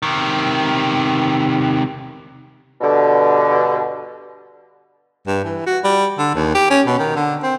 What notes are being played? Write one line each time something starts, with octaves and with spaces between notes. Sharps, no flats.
C3 D#3
G2 B2 D3
G2
E3
F#4
G3
D3
D#2
G4
C#4
B2
D#3
D3
C4